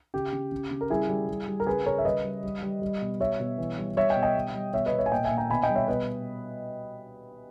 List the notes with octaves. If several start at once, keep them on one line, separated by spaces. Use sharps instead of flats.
C#3 G4
C#3
C#3
C#3
A#4
G3 E4 G#4
G3
G3
G3
A#4
C#3 G#4 B4
C#3 A#4 C#5
E5
G3 B4 D#5
G3
G3
G3
G3
B2
G3 C#5 E5
B2
E3
G3
G3 C#5 E5
D#5 G5
B2
D#5 G5
G3
G3
B2 C#5 E5
B4 D#5
B2
C#5 E5
G#5
A#2 D#5 G5
E5 G#5
A#2
G5 A#5
B2 G#5 B5
D#5 G5
G3
C#5 E5
B2 B4 D#5